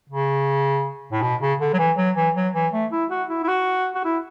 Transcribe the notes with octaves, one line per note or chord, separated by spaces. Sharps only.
C#3
A2
B2
C#3
D3
F#3
E3
F#3
E3
F#3
E3
A3
E4
F#4
E4
E4
F#4
F#4
E4